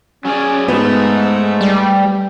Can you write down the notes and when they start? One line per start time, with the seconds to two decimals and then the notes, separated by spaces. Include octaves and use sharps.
0.25 F#3 C#4 G#4 D5
0.68 G#2 A3 B3
1.61 G3